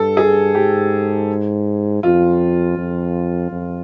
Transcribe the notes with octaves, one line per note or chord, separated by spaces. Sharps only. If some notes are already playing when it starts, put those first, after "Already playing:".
Already playing: G2 A4
G#4
G#2 G4
F2 F4
F2
F2